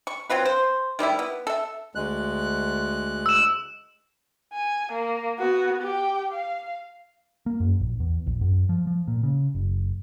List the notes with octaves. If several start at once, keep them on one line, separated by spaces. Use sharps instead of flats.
C#6
F#3 C4 F4 B4
C5
D#3 G3 A3 E4
B3
A4 E5
D2 G#3 F#6
E6 E7
G#5
A#3
B3 F#4
G4 G5
F5
A#3
F#2
A#1
E2
A#1
F#2
F3
F3
A#2
C#3
F#1